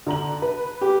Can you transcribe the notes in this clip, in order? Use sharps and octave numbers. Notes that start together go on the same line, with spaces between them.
D3 A#5 F#7
B4
G4